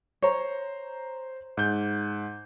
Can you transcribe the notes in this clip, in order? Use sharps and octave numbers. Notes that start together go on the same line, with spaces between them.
C5 C#5 A#5
G#2 G6